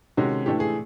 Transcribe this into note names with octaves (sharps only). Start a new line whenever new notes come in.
C3 D#3 G#3 C#4 F#4
A2 E3 A3 D4 G4
G#4